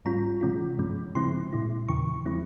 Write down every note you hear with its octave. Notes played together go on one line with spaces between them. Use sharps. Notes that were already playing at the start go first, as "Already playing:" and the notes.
G#2 G3 C#4 F4 A#5
C3 E3 G#3 C#4 F4
G2 F3 G#3 C#4
C#3 F3 G#3 C4 E4 C6
A#2 G#3 E4
E2 C#3 E3 C#6
F3 G#3 C4 E4